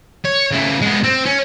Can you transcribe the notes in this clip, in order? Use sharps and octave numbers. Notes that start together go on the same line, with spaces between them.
C#5
C#3 E4
G#3 B3
C4
C#4